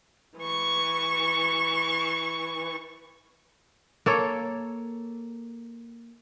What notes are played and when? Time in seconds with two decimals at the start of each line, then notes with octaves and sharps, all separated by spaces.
0.38 E3 C#6
4.06 A#3 A4 C#5